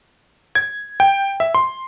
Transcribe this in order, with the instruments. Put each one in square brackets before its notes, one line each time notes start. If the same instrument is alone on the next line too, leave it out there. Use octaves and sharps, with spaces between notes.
[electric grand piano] G#6
G5
E5
C6